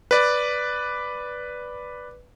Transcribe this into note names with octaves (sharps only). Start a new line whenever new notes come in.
B4 D5